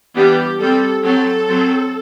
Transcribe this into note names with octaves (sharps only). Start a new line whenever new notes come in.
E3 G3 B3 D4 G4
G3 C4 A4
F#3 C4 A4
F#3 C4